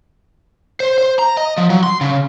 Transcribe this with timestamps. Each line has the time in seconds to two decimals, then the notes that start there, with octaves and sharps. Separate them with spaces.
0.80 C5
0.98 C5
1.19 A#5
1.37 D#5
1.58 F3
1.70 F#3
1.83 C6
2.01 C#3